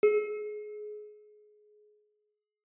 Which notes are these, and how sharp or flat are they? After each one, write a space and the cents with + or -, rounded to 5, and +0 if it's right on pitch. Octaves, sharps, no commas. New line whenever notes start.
G#4 +25